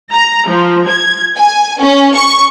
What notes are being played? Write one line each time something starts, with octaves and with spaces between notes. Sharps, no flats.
A#5
F3
G#6
G#5
C#4
C#6